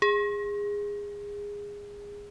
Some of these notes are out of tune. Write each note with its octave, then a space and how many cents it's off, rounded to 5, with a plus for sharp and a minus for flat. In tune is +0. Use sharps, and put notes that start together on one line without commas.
G#4 -20